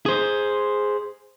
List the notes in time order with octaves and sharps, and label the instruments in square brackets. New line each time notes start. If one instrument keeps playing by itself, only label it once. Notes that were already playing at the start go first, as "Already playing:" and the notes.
[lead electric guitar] G#4 C5